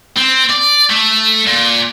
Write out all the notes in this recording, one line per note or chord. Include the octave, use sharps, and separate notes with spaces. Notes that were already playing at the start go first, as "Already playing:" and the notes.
C4
D5
A3
A#2